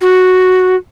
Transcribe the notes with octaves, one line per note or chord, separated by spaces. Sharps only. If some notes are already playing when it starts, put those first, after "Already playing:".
F#4